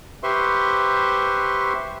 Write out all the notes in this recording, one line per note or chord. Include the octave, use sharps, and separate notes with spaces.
G4 B4 C5 E5 C6 C#6